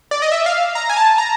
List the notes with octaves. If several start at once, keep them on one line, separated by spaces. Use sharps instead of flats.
D5
D#5
E5
F5
A#5
G#5
A5
A#5